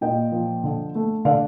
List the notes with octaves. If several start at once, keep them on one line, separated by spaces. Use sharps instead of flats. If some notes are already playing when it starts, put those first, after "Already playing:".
A#2 D#5 G5
F3
D3
A3
D3 D5 F5